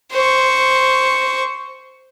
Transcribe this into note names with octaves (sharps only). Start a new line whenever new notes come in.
C5 C#6